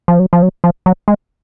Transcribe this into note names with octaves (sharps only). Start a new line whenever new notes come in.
F3
F#3
F3
F#3
F3
F#3
G#3